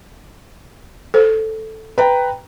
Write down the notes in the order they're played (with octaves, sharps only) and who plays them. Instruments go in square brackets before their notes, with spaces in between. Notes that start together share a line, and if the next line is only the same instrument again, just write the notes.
[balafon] A4 C5
[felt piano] B4 G5 A#5